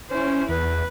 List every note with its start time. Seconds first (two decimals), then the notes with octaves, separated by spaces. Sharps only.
0.11 C#4 E4 C5
0.49 E2 B4